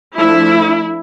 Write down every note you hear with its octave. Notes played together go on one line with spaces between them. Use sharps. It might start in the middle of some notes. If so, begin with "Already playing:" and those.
F3 A3 D4 E4